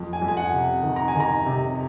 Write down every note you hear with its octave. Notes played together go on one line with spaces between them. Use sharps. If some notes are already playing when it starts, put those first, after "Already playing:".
Already playing: F2
G#5
F2
G#5
F#5
C3
D#3
A#5
G#5
D#3
A#5
C3